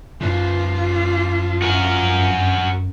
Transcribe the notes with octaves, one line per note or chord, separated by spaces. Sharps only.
F#2 F3 F4 B4
F#4 A#4